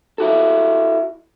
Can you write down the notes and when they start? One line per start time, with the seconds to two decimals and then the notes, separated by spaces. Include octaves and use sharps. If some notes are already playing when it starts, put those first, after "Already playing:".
0.18 E4 F#4 A4